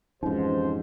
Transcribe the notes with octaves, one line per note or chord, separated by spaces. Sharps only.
F2 G#2 E3 C#4 D#4 G4 C5